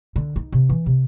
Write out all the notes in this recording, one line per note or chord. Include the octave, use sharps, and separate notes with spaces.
D3
D#4
C3
E3
C3